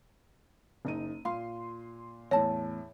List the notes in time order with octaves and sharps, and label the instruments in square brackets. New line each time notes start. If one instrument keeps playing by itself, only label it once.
[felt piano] F#1 D#4 D#7
[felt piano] A#2 C6 [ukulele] F5
[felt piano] E2 A2 [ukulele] E4 A5 [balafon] C#5